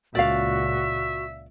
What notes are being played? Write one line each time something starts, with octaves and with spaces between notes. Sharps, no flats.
C#2 A#2 F#4 D5 E5 F5